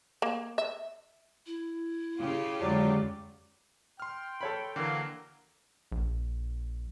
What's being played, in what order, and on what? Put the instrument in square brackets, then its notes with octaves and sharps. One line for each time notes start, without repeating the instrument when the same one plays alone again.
[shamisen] A#3
E5
[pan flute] E4
[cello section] C#3 F4 G4
[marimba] F2 D3 G#3 [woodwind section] F#3 D5
[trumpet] G5 [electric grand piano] C6 F6
[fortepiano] A4 C#5 B5
[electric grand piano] D3 E3 [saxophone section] F#3 A#3
[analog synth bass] A#1